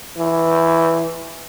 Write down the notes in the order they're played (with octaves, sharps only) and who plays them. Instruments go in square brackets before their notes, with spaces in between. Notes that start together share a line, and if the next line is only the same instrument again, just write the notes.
[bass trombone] E3